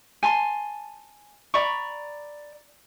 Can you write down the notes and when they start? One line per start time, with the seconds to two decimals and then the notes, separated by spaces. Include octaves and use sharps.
0.23 G#5 A5 C6
1.54 D5 A#5 B5 C#6